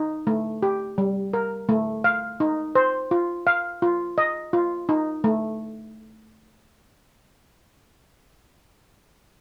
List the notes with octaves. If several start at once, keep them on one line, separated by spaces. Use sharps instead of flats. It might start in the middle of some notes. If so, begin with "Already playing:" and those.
Already playing: D#4
A3
G4
G3
A#4
A3
F5
D#4
C5
F4
F5
F4
D#5
F4
D#4
A3